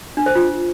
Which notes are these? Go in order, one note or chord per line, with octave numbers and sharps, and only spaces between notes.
D4
C5
F4